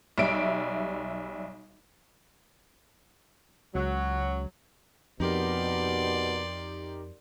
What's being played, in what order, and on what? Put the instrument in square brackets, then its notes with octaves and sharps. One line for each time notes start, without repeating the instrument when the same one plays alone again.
[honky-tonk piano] B1 G3 E5 D7
[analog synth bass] C#2 [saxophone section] F#3
[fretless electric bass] F2 [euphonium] B2 [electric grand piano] D#4 G4 A#4 [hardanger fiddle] D5 C6